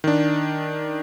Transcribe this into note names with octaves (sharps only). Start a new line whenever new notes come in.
D#3 D4